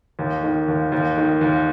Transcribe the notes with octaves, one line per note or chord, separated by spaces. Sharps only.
D#2
D#3
D#2
D#2
D#3
D#2